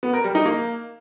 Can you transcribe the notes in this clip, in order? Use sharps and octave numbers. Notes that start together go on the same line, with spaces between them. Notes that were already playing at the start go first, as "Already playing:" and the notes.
B3
A#4
G3
D#4
A#3